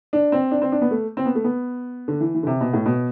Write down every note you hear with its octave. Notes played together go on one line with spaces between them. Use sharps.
D4
C4
D4
C4
D4
B3
A3
C4
B3
A3
B3
D3
E3
E3
D3
C3
B2
A2
B2